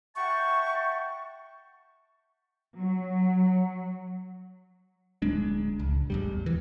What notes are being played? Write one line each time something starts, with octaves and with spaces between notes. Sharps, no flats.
E5 F#5 G5 A5 C#6
F#3
D1 G#3 D4
C#2
A1 E2 G3
E3